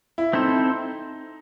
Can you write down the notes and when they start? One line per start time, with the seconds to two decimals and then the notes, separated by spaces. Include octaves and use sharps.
0.18 E4
0.33 C4 D#4 E4 A4 C5